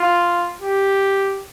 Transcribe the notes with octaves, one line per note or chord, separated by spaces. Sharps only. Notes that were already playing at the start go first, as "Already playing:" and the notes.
Already playing: F4
G4